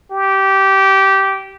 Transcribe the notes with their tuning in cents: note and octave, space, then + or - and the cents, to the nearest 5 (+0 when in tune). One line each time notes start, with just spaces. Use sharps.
G4 -15